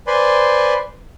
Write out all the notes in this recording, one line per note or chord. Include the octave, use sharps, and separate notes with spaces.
B4 C5 D5 G#5 B5 C6